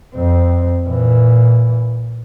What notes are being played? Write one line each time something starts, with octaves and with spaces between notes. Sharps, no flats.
F2 C4
A#2 E3